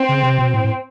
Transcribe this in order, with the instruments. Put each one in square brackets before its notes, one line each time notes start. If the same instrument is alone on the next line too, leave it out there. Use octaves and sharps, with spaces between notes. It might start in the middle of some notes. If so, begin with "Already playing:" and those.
Already playing: [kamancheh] C4
[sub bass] C#3
C3
B2
A2
A2